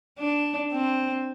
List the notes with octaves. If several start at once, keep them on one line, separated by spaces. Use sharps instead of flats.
D4
C4